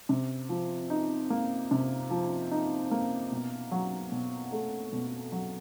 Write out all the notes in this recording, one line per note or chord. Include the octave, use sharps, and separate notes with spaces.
C3
F3
D#4
A#3
C3
F3
D#4
A#3
B2
F#3
B2
A3
B2
F#3